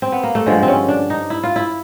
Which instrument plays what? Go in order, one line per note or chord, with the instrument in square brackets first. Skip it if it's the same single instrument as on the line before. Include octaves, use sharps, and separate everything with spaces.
[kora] C4
B3
A#3
A3
G2 D3 F3 G#3
C4
C#4
D4
D#4
E4
F4
E4